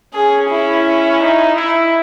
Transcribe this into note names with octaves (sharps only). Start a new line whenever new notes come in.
C#4 G#4
E4
D#4
E4